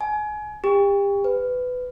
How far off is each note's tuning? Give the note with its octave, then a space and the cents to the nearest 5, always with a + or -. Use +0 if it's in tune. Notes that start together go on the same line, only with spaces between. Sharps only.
G#5 +30
G4 +35
B4 +20